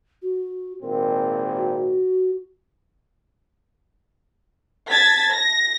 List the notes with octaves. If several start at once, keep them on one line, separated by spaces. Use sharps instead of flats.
F#4
G#1 A#2 C4 A#4
F#4
A5 G#6 A6 B6
A#6